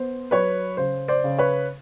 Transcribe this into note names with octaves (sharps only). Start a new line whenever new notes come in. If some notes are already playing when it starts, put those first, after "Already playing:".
Already playing: B3 C5
F#3 B4 C#5
C#3 C5
C5 D5
C#3
B4 C#5